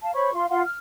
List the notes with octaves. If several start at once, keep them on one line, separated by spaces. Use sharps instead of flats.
F5 A5
C5 C#5 B5 C#6
F4 F5 C6
F4 F5 F#5 C6
F6